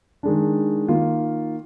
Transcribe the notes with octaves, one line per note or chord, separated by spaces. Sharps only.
D#3 G#3 D4
D#3 A#3 F4